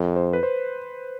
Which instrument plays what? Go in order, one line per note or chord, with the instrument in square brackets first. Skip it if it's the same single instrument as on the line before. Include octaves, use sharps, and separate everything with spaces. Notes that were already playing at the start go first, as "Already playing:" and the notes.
Already playing: [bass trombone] F2
[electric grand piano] C5
B4
C5